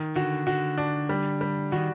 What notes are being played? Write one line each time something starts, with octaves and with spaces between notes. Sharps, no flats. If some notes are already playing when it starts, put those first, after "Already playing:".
Already playing: D#3
D3 F#4
D3 F#4
D4
G3
G3
D#3 F#4